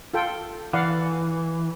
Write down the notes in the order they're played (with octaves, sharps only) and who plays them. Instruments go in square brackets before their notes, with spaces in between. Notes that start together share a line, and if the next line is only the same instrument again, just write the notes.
[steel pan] F4 A4 G5
[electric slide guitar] E3 [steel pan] D5 F5 F#5